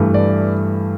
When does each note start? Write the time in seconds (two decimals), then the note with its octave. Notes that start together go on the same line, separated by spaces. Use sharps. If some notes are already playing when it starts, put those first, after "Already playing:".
Already playing: G2 E3 A3
0.14 D5